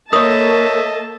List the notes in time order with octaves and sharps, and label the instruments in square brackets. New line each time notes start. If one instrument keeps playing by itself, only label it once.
[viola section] A#3 A4 A5 [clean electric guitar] A#4 C#5 [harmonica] D#5 E5 [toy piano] D#6